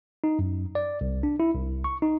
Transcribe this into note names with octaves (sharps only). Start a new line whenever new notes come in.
D#4
F#2
D5
C2
D4
E4
C2
C#6
D#4